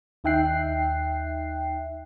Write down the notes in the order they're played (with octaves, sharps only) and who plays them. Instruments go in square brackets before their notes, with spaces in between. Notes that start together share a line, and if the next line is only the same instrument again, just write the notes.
[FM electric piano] D#2 D#4 E5 G5 F#6 C7